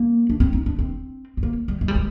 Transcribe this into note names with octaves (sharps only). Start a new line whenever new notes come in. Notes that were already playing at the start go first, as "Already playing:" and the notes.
Already playing: A#3
D4
C4
D#4
D4
C4
C4
A#3
G3
G#3
G3
G#3